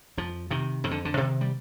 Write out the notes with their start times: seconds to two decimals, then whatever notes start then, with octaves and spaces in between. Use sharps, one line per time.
0.17 F2 F3
0.51 C3 D#3
0.84 F2 D#3
0.91 D3
1.05 D3
1.17 C3 D#3
1.41 G3